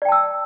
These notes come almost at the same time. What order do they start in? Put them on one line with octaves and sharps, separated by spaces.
D5 G5 A5 E6